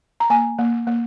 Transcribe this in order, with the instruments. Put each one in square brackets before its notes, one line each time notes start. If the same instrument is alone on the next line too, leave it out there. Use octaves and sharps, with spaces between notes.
[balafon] A#5
A#3 G#5
A#3
A#3